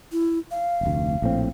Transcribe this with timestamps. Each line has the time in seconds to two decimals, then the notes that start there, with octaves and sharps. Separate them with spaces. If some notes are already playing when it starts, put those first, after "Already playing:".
0.12 E4
0.51 F5
0.81 F1 D2
1.22 A#1 A2 C4